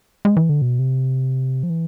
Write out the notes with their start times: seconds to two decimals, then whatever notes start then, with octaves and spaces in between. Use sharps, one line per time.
0.25 G#3
0.37 E3
0.49 D3
0.62 B2
0.79 C3
1.63 F3
1.70 E3